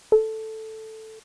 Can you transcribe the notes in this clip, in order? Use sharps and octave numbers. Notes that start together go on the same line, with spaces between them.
A4